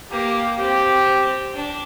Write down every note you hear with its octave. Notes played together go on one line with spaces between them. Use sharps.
A#3 G4
C4 G4
D4